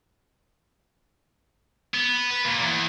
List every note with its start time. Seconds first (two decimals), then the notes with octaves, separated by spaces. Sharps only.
1.94 B3
2.30 B4
2.45 A#2
2.62 E2